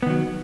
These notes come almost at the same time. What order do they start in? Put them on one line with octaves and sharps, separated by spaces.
B3 D#3 F#3